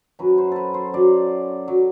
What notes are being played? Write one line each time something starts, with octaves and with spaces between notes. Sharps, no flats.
F#2 F#3 B4
C5
A4 B4
C5
F#2 F#3 D5
F#3